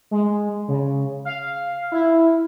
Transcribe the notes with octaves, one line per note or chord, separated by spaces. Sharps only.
G#3
C#3
F5
E4